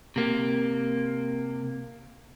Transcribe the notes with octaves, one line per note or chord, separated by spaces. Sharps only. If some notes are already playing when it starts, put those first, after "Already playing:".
C3 A#3